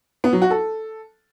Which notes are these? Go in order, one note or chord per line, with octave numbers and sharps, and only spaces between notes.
B3
F#3
F#4
A4